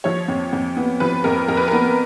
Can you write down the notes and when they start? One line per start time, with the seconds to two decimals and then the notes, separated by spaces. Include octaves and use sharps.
0.04 F3 C#5
0.28 F2
0.52 F2
0.77 B3
1.00 F3 B4
1.24 F2 A#4
1.48 F2 A#4
1.57 B4
1.68 B3 A#4